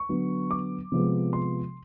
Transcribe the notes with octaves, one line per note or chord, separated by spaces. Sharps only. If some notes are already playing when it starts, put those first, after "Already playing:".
Already playing: C#6
D3 F#3 B3
D6
C3 F3 G#3 B3
C6